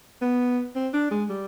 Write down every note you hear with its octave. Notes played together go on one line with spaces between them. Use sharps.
B3
C4
D4
G#3
G3